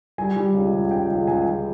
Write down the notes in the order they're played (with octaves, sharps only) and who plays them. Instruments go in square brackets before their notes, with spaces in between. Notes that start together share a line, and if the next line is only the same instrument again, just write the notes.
[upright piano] G3 G#5
G3
C#2
C#2
C#2 G5
C#2
C#2 G#5
C#2